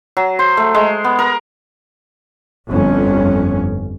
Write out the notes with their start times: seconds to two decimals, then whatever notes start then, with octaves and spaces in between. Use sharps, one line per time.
0.17 F#3
0.39 C5
0.57 A3
0.75 G#3
1.04 B3
1.19 A#4
2.67 G1 F2 C#4